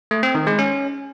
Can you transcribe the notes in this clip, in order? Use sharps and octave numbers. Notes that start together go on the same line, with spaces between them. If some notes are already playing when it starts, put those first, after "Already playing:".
A3
C4
D#3
G#3
C#4